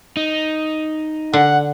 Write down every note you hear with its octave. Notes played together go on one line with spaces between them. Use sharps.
D#4
D3 F#5